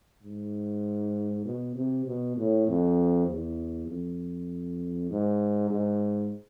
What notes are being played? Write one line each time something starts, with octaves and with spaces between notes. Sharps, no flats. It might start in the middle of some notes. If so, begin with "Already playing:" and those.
G#2
B2
C3
B2
A2
F2
E2
F2
G#2
G#2